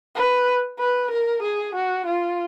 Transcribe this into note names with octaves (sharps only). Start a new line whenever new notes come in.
B4
B4
A#4
G#4
F#4
F4